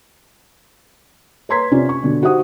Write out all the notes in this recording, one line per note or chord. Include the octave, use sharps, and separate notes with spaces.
B4 C#5 A#5 C6 G#6 B6
C3 C#4 F4 D5
C#6
B2 D3
D#4 F#4 G4 C5 F#5 D#6